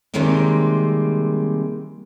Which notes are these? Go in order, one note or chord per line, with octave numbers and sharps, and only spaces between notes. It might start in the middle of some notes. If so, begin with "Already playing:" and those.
C3 D#3 G3 G#3 A#3 C4